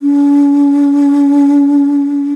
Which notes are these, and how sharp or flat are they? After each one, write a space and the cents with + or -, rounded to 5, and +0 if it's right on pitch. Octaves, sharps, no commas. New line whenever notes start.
C#4 +45